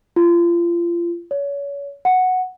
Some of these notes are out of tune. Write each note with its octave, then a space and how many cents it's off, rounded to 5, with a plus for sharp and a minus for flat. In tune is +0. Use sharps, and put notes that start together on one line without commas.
F4 -30
C#5 +30
F#5 -5